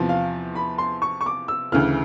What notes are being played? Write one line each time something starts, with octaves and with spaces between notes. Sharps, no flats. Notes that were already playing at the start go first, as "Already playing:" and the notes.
Already playing: E2 C3 F3
F5
B5
C6
C#6
C#6
D6
E6
D2 C#3 E3 F6